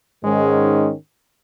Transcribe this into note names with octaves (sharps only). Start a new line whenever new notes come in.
G#2 D#3 G#3 C#4